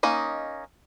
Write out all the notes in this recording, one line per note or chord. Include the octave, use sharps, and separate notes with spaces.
A#3 C#4 D#4 D#5